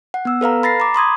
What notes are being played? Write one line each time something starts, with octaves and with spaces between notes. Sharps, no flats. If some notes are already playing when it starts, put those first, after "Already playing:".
F#5
B3 E6
A4 B4 F5 A#5
B5 A6 A#6 C7
A#5 D6
B5 C6 D#6 G#6